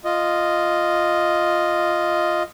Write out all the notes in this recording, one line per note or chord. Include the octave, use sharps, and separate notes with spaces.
F4 D#5